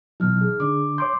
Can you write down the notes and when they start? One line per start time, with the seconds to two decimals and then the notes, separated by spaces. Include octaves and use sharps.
0.20 B2 E3 F#3 D#4 F6
0.41 G#4
0.60 D3 D4 D6
0.98 C#5 C6 D6 G6